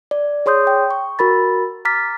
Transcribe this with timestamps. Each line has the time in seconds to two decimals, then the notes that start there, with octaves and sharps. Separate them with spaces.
0.11 D5
0.46 G#4 C#5 C6 D#6 G6
0.67 G5
0.90 C#6
1.19 F#4 A#4 B5 A6
1.85 A#5 D6 F6 A6 B6